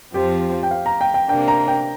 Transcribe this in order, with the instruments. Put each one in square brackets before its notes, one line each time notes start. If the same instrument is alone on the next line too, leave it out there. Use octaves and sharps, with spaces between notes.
[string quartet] F2 F3 C4 F4 [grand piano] G4
[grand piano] G5
F5
A#5
G5
G5
[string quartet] C3 A#3 D4 [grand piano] G5
[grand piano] A#5
G5